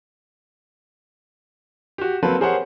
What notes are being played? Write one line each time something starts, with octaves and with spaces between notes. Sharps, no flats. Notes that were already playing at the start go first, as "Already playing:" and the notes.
F#4 G4
F#3 A#3 C4 A4 B4
G4 G#4 A#4 C5 C#5 F#5